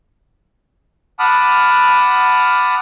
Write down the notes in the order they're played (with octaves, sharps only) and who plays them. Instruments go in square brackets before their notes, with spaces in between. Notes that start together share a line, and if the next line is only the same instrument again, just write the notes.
[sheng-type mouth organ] F#5 A5 B5 D6 D#6 F6